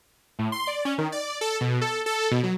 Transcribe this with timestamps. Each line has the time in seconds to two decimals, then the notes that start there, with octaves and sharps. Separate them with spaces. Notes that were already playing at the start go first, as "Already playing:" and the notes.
0.39 A2
0.52 C6
0.67 D5
0.85 C#4
0.98 D#3
1.12 D5
1.41 A4
1.61 B2
1.81 A4
2.06 A4
2.31 B2
2.43 F#3